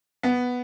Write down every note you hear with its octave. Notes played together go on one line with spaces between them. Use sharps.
B3